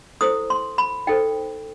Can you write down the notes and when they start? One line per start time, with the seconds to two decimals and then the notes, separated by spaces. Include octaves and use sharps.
0.21 E4 A4 C5 D#6
0.50 C6
0.78 B5
1.07 D#4 A4 C5 G5